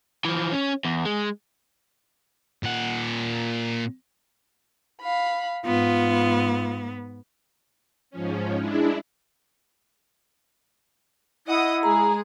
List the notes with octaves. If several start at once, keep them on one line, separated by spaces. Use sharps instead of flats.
E3 F3
C#4
E2
G#3
A#2 F#5
F5 B5
G#2 B3 F4
G#2 F3 C#4
G#3 D4 E4
E4 D#5 F#5 D#6
G#3 G#4 A#5